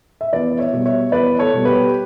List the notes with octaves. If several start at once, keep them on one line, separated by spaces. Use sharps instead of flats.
E5
E2 B4 D5
C#5 E5
B2 G3
C#5 E5
E2 B4 D5
A4 C#5
B2 G3
G4 B4